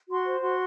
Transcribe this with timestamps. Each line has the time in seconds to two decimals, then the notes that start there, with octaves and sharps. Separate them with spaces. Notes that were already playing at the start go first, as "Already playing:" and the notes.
0.09 F#4 C6
0.26 C5
0.42 F#4 C6